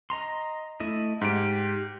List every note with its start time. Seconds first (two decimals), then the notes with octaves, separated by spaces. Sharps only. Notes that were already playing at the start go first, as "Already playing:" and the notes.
0.10 D#5 A#5 C6
0.80 A3 E4 D#5
1.21 G#2 G4 D7